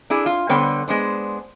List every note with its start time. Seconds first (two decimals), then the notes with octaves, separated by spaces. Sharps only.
0.10 D4 E4 G#4
0.26 F4
0.49 D3 G3 B3 C5 C#5 G5
0.88 G#3 B3 D4 C5